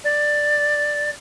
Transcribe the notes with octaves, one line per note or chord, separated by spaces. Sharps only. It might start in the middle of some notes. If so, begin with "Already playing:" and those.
D5